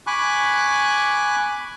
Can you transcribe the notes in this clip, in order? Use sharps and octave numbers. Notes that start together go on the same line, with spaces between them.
G#5 B5 C#6 D6 F#6